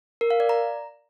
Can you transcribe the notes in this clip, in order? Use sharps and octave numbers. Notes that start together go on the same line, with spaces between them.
A#4
F5
D5
A#5